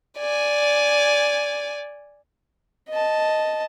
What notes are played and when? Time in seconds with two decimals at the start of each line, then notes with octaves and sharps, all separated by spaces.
0.19 D5 G#5
2.89 D#5 A5